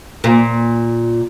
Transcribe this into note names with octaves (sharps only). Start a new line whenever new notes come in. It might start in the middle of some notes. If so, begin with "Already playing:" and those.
A#2